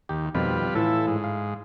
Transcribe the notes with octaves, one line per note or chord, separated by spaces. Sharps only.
D#2 G4
F2 B2 D#3 G3 F4 B4
A2 E3 E4 F4 A4
G#2
F5